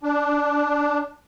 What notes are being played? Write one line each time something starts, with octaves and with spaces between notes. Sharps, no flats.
D4